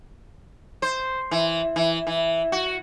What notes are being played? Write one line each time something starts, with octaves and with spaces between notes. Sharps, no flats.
C5
E3
E3
E3
F#4